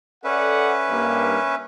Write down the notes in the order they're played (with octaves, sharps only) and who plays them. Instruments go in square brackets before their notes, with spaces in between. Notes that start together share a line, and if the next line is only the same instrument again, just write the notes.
[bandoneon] C#4 B4 E5 [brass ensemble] A4 D5 F#5
[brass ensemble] G2 A#3